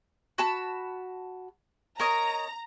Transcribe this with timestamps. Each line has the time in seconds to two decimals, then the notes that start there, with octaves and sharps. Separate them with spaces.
0.38 F#4 A5 B5
1.99 A#4 C#5 D#5 A#5